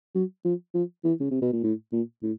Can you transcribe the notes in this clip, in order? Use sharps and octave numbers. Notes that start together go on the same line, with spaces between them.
F#3
F3
F3
E3
C#3
C3
B2
A#2
A2
A#2
A2